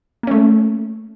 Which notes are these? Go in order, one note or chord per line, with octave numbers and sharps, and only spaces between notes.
A3 A#3 C#4